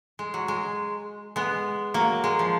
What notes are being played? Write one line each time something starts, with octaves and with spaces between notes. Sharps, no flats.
G#3
F#3
G#3
G#3 B3
F#3 A#3
G#3
F3